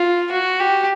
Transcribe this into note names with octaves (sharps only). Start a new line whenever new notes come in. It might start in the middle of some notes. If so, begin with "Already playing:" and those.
Already playing: F4
F#4
G4